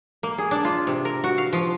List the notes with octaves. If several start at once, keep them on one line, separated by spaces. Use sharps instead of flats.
A#3
G#4
D4
F4
C3
A#4
F#4
F5
F3